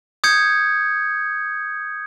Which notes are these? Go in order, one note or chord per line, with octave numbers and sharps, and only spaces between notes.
D#6 G6 G#6 C#7